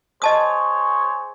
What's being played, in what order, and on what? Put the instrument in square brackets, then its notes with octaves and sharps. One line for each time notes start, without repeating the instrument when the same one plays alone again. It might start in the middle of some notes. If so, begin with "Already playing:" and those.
[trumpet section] G#4 C5 C#5 [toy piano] D#5 A5 D#6